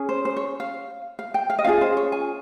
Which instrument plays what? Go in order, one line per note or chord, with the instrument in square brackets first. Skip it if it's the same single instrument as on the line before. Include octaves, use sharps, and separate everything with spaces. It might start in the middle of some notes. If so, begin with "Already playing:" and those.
Already playing: [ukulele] C#4 G#4
C5
C5
C#5
F5
F5
G5
F5
D#5
C#4 F4 G#4 F5
C5
C#5
G#5